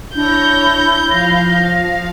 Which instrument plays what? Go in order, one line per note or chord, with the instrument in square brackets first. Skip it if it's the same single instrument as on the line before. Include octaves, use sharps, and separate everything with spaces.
[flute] D4 [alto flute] E4 [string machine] C#5 A#6 [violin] G6
[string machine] F3 F5 [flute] A#6